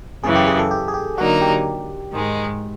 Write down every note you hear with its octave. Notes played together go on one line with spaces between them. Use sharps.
F#2 C#3 E3 G#4
G4
G#4
A4
G4
G#4
G4
D3 F#3 A#3 D#4 F#4
G4
G#2 D#3 G#3